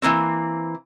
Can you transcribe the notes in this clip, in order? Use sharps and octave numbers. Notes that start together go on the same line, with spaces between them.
E3 F3 A#3 C4